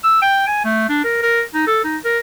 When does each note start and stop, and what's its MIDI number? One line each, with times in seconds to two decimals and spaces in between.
0.04 0.19 88
0.22 0.44 79
0.47 0.63 80
0.65 0.89 57
0.89 1.01 62
1.04 1.19 70
1.23 1.43 70
1.54 1.67 63
1.67 1.79 69
1.84 1.97 63
2.05 2.19 70